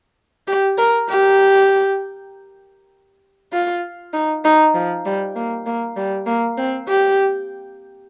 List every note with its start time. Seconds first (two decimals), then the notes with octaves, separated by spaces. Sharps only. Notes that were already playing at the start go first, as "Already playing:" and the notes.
0.47 G4
0.78 A#4
1.09 G4
3.53 F4
4.13 D#4
4.44 D#4
4.74 F3
5.06 G3
5.35 A#3
5.66 A#3
5.96 G3
6.26 A#3
6.58 C4
6.88 G4